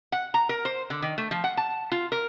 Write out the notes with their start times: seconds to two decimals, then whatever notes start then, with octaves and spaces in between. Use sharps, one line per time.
0.12 F#5
0.34 A#5
0.49 A#4
0.65 C5
0.90 D3
1.02 D#3
1.18 A3
1.31 F3
1.44 F#5
1.57 A5
1.92 F4
2.12 A#4